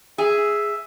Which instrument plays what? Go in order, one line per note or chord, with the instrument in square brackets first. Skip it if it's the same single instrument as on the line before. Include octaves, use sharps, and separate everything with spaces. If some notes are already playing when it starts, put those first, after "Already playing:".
[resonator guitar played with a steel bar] G#4 [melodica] E5